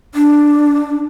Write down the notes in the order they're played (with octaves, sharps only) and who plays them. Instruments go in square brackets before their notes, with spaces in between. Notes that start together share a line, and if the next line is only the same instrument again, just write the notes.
[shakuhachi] D4